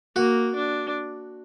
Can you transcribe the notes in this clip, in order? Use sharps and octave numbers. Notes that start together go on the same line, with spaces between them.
A#3 F#4
D4